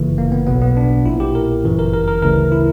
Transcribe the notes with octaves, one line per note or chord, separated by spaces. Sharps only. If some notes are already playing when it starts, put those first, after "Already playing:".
Already playing: G1 F#2 C#3 E3 A#3
A#3
B3
B1 B2 B3
B3
D4
A#1 A#2 E4
G4
A#4
G1 F#2 E3
A#4
A#4
A#4
D2 C#3 E3 A#4
E4